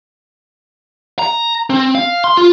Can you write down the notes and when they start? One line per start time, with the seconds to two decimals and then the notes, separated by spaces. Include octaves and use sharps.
1.19 A#5
1.70 C4
1.95 F5
2.24 C6
2.37 F4